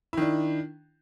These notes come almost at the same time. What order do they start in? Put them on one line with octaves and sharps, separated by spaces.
E4 D#3 D4